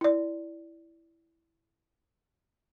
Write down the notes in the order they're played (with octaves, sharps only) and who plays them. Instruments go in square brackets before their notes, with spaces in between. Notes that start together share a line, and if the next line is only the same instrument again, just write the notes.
[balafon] E4 D5